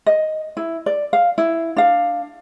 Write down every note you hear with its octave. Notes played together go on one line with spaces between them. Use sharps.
D#5
E4
D5
F5
E4
D4 F5